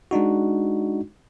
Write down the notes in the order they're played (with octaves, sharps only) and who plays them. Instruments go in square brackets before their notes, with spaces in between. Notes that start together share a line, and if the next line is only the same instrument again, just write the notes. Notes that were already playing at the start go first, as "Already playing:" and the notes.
[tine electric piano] G#3 D4 D#4 F#4